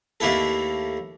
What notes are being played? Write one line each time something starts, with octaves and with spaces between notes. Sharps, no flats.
D#2 A3 A#3 E4 A4